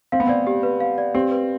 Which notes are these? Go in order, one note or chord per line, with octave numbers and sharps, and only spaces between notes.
C4 F5
B3
C4 D5
G4
B4
F5
D5
C4 G4
B4